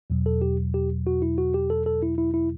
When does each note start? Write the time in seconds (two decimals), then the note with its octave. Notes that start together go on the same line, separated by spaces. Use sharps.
0.10 E2 B2 F#3
0.26 A4
0.42 G4
0.74 G4
1.07 F#4
1.22 E4
1.38 F#4
1.54 G4
1.70 A4
1.86 A4
2.02 E4
2.18 E4
2.34 E4